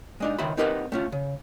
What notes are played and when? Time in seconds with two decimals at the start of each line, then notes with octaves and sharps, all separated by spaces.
0.20 G#3 D4 D#4
0.38 C#2 D#3 C5 E5 B5
0.57 C4 D#4 G4 A#4 B4 F#5
0.92 A3 C#4 F4
1.12 C#3